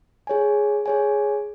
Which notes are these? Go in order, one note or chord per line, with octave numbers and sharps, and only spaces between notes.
G#4 C#5 G#5
G#4 C#5 G#5